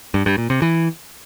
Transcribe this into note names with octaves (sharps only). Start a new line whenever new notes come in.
G2
G2
A#2
C3
E3